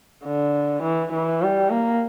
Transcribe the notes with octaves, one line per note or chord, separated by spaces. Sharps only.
D3
E3
E3
G3
A#3